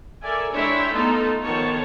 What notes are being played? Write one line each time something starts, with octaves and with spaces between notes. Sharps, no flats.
A4 A#4 D5 E5 G#5
G#3 D4 E4 C#5 E5 G5
A3 B3 D#4 F4 A4 A5
D#3 F3 B3 A4 C#5 A5